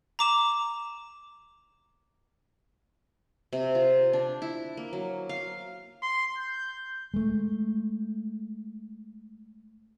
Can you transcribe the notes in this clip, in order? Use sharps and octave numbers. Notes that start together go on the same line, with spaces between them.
A#5 D6 E7
C3
F4
D4
E4
A#3
F#3
F5
C6
G6
G#3 A3